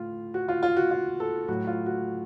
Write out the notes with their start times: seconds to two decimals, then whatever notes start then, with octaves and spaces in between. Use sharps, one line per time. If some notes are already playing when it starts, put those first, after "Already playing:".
Already playing: A2 F4
0.34 F#4
0.49 F4
0.63 F4
0.77 F#4
0.91 F4
1.20 A4
1.48 A2 F#3 F#4
1.67 F4
1.86 F#4